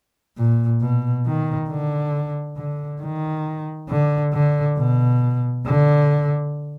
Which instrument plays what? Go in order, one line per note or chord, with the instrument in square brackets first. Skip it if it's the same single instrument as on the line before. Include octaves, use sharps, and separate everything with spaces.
[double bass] A#2
B2
D#3
D3
D3
D#3
D3
D3
B2
D3